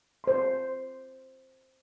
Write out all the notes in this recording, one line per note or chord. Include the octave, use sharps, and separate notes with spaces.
C5 C6